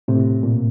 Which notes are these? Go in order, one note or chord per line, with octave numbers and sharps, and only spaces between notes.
A2 C3
A#2